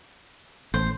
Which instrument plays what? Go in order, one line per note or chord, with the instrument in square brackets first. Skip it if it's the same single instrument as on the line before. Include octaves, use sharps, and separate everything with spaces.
[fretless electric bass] A1 [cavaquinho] C5